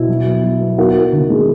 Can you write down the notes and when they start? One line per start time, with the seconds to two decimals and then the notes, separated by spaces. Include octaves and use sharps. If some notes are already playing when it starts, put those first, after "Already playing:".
Already playing: B2 E4
0.08 F#3
0.25 B3
0.43 F#3
0.61 B3
0.78 B3 F#4 A#4
0.95 B3
1.13 D#3
1.30 G#3